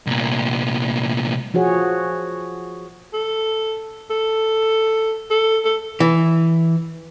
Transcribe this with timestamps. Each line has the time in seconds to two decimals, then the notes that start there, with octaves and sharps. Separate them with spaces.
0.07 C2 A#2
1.54 F3 F#4 G#4 C#5
3.14 A4
4.11 A4
5.31 A4
5.65 A4
6.00 E3